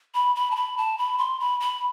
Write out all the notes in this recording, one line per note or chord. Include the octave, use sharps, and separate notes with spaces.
B5
B5
A5
B5
A5
B5
C6
B5
B5